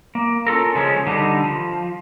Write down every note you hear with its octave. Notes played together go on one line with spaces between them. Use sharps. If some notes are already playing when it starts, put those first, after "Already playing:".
A#3
C#4 F4 A4 A#4
C#3 F3 G#3 C#4
D3 G3 D#4
F3